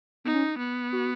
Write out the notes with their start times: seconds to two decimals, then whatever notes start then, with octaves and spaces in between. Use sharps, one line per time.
0.25 B3 D#4
0.34 C#4
0.59 B3
0.92 F#4